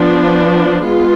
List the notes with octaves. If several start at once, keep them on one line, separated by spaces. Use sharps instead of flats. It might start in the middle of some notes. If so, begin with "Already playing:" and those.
Already playing: F3 B3 D4
G#3 B3 F4